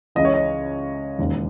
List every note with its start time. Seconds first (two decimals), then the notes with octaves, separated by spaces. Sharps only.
0.15 C#2 C#3 E3 D#5
0.25 C#5
0.34 D#5
1.19 E1 D#2 C#3